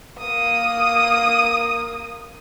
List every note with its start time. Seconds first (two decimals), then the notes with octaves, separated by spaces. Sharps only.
0.19 A#3 D#6